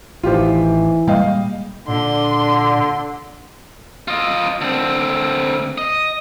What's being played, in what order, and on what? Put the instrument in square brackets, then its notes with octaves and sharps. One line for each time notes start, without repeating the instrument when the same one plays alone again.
[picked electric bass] A1 D#3 [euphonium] E3 [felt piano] F4 G4 C5
[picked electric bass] A#2 G3 G#3 [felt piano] D#5 F5 G5
[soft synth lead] A#2 [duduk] D3 [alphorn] D4 [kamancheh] C6
[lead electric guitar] F4 D#5
D3 C4
D#5